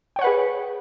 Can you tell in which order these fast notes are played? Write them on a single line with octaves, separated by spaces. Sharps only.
G5 C#5 F#5 B4 G#4